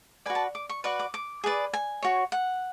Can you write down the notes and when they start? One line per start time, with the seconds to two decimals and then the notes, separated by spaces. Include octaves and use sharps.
0.26 F#4 B4 D5 G#5
0.35 A5
0.55 D6
0.69 C#6
0.84 F#4 B4 D5 C#6
0.99 D6
1.14 D6
1.44 G#4 B4 D5
1.73 G#5
2.03 F#4 C#5
2.32 F#5